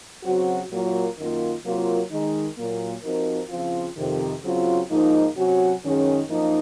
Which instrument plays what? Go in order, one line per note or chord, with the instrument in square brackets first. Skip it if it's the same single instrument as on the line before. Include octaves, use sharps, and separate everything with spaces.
[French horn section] C#3 F#3 C4 F#4
A#2 F#3 A#3 F4 A#4
F#2 D#3 A#3 F4
C3 F#3 A#3 F4 A#4
D#3 G#3 D#4
A#2 F#3 A#3
F3 C4 D#4 F#4 A#4
C#3 F3 C4 F4
F2 C3 D#3
C#3 F#3 C4 F4
G#2 F3 A#3 D#4
C3 F#3 C#4 F#4
F#2 D#3 G#3 C#4 G#4
F#2 F3 A#3 D#4